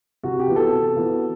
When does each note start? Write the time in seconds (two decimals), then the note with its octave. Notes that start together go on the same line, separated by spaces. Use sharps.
0.23 C3 F#4
0.40 G4
0.47 E3 B3 F#4
0.56 A4
0.72 C3
0.96 E3 B3 F#4